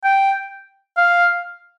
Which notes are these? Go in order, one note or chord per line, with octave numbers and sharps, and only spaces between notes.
G5
F5